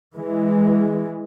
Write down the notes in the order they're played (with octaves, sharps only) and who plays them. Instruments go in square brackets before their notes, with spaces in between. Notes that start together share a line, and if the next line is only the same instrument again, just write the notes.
[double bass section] E3 G#3